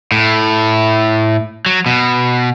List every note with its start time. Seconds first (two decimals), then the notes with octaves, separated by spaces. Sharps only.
0.12 A2
1.66 F#3
1.86 B2